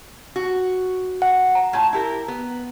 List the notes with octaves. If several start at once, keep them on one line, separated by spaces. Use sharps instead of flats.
F#4
F#5
A#5
A2 F4 A5
E4 G4 A#4
B3